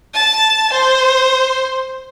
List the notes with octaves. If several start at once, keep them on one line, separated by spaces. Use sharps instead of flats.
A5
C5